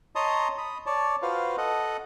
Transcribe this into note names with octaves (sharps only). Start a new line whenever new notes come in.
C#5 D#5 A5 A#5 C6 D#6
B5 D#6
C#5 D5 A5
F4 F#4 B4 C5 F5
A4 D#5 F#5